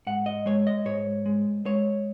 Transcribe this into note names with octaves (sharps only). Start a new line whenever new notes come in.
G#2 F#5
D#5
G#3 C#5
D#5
G#2 C#5
G#3
G#3 C#5